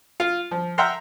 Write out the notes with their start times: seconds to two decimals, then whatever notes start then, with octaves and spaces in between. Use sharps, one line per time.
0.20 F4
0.51 F3
0.78 E5 F#5 G5 A#5 C6 F6